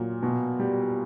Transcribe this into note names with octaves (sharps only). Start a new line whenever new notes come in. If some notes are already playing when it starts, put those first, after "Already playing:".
Already playing: A#2 F#3
B2
G3